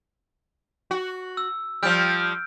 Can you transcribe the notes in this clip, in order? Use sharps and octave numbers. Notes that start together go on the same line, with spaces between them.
F#4
E6
F3 G3 F6 G6 D7